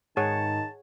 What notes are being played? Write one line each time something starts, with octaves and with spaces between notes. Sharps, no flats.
G#2 D#3 G#4 C#5 F#5 A5